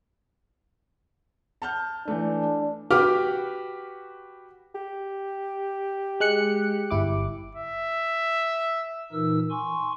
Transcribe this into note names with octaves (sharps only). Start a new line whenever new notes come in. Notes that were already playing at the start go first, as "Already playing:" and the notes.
A5 F6 G6
E3 A3 D4
F#4 G4 B4 D6 F6
G4
G#3 F#6 C#7
G1 E4 D6
E5
A#2 E3 D#4 A#4 E6
G#5 C6 C#6